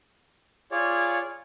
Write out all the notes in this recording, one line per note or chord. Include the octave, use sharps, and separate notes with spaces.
F4 G#4 C#5 D5